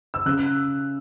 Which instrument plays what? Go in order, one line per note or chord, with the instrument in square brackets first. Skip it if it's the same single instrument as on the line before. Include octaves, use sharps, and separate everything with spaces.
[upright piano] E6
C#3 F#6